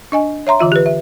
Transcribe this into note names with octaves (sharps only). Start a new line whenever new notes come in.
D4 D#5 G#5
C#5 E5 A#5 C6
D3 E3 F4 E5
G4 B4
E5